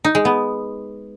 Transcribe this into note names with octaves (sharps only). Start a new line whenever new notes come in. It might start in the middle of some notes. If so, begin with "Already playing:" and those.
D#4
G#3
B3